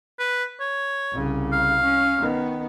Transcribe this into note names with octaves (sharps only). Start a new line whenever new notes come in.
B4
C#5
C2 C#3
F5
C#4
D#3 B3